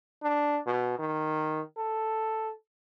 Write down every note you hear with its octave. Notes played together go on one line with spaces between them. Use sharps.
D4
B2
D#3
A4